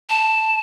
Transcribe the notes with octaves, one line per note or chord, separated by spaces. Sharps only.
A5